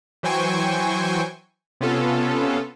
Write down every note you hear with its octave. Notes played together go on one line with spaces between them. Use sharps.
E3 F#3 C5 G5 G#5 C#6
C3 B3 C#4 F4 A4